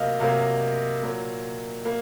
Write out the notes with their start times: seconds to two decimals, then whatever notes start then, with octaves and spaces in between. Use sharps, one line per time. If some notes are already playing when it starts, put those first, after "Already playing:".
Already playing: C3 F#3 A#3 D#5 F5
0.19 C3 F#3 A#3 F5
1.02 A#2 F#3 A#3
1.85 A#3